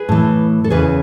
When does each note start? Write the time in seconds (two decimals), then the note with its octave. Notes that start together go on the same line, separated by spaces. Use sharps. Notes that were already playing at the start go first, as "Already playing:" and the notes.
Already playing: G#4 B4
0.09 A2 E3
0.64 A4
0.70 E2 C#3 E3 G#4 B4